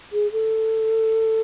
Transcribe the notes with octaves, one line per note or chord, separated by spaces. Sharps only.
G#4
A4